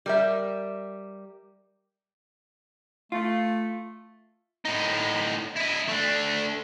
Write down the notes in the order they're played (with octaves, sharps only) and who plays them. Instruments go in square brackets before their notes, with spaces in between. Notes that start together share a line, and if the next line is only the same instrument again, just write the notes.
[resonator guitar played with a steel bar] G3 A#4 E5
[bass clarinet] A3 [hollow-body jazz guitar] F4
[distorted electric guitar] A2 D#4
E4 D#5
A3 D4